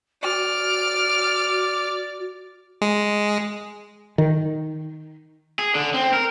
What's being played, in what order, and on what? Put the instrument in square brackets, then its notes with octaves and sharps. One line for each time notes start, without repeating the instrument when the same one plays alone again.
[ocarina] F#4 [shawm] D5 [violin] F6 D7
[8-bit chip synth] G#3
[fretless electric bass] D#3
[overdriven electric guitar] G#4
D3
C4
A#4